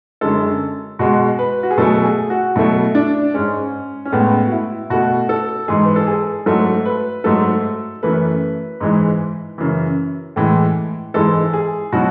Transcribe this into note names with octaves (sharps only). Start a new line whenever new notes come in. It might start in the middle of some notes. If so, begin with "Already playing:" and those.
F#2 D3 G#3 A4
B2 G#3 F#4
B4
F#4
G#4
B2 F#3 A3 A4
G#4
F#4
B2 F#3 A3 E4
D4
G#2 G#3 C#4
C#4
A2 G#3 B3
F#4
E4
B2 A3 F#4
A4
G#2 E3 G#3 G#4
B4
A4
G#4
G#2 F#3 A3 A4
B4
G#2 F#3 A3 A4
F#2 E3 A3 B4
G#2 E3 G#3
F#2 C#3 E3
A2 E3 G#3
G#2 E3 G#3 A4
G#4
B2 F#3 F#4